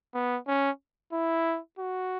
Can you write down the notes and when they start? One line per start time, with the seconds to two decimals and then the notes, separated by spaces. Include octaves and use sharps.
0.14 B3
0.47 C#4
1.12 E4
1.78 F#4